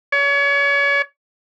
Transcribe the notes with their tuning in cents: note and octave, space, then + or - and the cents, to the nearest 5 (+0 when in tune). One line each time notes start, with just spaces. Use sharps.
C#5 +35